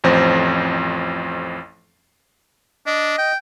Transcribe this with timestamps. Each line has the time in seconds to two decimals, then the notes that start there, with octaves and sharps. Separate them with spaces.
0.04 A1 F2 C5
2.86 D4 D#5
3.18 G5